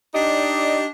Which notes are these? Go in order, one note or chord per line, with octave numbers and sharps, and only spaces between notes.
D4 D#4 G4 D5 D#5